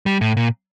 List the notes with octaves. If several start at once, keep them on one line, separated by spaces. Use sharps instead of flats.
G3
A2
A#2